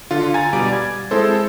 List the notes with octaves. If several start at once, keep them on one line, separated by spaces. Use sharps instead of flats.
D3 F4
G#5 A#5 A6
B2 G3 D5 D7
G#6
G#3 C4 E4 A4 C5